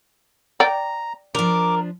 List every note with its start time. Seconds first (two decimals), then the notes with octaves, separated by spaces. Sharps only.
0.60 D5 G5 A#5
1.35 F3 D4 A#4 D6